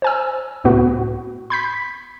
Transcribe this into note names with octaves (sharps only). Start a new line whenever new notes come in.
C5 G#5 E6
C#2 A2 B3 F#4
B5 G6 B6